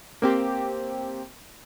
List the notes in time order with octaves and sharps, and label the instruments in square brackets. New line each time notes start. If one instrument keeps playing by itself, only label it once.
[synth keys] A#3 C4 G4